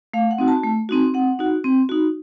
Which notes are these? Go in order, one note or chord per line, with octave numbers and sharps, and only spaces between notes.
A3 F5
F#5
C4 D#4 F#4
A5
A3
C4 D#4 F#4
C4 F#5
D#4 F#4
C4
D#4 F#4